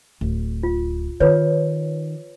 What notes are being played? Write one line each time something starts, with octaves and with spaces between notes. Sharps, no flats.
D1
F4
D#3 F4 B4 C#5